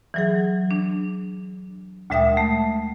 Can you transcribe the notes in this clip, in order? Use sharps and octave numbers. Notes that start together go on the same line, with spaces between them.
E3 F#3 G#4
D4
D2 A#2 G#3 E5 G5 D#6
A3